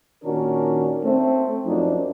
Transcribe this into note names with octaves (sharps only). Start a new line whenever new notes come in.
A#2 D#3 C#4 D4 F#4 A#4
A3 C4
F#2 F3 D4 D#4